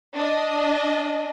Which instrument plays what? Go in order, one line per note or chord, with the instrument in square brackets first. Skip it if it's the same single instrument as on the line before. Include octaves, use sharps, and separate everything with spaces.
[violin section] D4 D#5